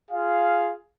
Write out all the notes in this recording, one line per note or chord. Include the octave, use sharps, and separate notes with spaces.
F4 G#4 F5